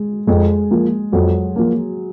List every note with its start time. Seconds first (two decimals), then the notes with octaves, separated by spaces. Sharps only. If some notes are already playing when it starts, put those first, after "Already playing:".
Already playing: G#3
0.27 F2 G#3
0.71 F3 A#3
1.13 F2 F#3
1.56 F3 A#3